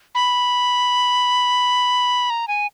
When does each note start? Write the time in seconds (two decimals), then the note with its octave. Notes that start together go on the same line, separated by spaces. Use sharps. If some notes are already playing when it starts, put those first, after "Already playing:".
0.15 B5
2.30 A#5
2.48 G#5